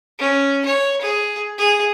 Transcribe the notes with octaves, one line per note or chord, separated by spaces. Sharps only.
C#4
C#5
G#4
G#4